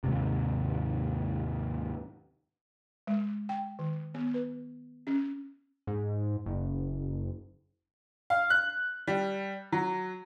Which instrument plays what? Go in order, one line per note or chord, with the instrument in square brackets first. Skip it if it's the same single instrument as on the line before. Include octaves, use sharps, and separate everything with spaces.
[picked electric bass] D#2 G#2 C3
[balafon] G#3
G5
D#3
B3
B4
C#4
[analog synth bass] G#2
F#1
[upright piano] F5
F#6
G3
F#3